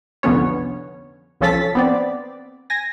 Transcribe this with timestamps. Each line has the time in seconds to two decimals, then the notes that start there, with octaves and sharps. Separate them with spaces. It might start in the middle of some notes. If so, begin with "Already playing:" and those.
0.23 C2 F2 D3 B3 C#4 C#5
1.41 C2 F3 C#4 A4 A6 B6
1.75 B3 C4 D5
2.70 G#5 A#6